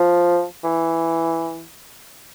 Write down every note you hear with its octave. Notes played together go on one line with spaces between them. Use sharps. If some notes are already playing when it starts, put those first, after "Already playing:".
Already playing: F3
E3